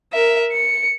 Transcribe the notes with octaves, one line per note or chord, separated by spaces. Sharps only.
A#4 E5
C#7